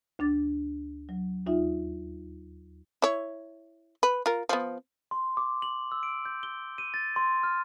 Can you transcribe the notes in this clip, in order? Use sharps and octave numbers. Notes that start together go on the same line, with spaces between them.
D2 D4 D6 A6
F#3
D#2 D#4 F4 E5
E4 C#5
B4
F4 A#4
F3 B3
C6
D6
F#7
E6
D7
G6
G7
D#7
A6
C6
F6